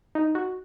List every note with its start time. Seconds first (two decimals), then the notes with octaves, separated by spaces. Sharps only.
0.15 D#4
0.35 F#4